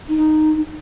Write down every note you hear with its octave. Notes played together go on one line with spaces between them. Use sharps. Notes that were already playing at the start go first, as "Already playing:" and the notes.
D#4